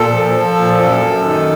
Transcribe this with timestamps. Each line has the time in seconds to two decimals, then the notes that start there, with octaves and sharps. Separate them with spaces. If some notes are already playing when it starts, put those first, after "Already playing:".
Already playing: A#2 A4
0.11 F3
0.33 F3
0.56 A#2
0.78 F#2 A4
1.01 F#2
1.23 D#3